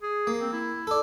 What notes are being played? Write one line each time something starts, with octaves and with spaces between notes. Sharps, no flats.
G#4
A#3
C4
E4
A4 D5